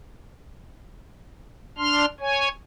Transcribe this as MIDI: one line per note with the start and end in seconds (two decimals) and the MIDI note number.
1.78 2.05 62
1.78 2.05 84
1.78 2.05 89
2.20 2.48 73
2.20 2.48 80